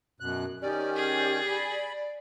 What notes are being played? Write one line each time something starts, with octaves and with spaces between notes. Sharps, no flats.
F#2 B2 F#6
D#3 C#4 G4 D5
G#4
B5